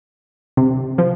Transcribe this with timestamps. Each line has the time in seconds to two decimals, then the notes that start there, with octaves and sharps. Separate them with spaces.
0.57 C3
0.98 F3